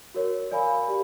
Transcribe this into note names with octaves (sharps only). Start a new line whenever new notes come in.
F#4 A#4 C#5
A#4 D5 F5 G#5 B5
G4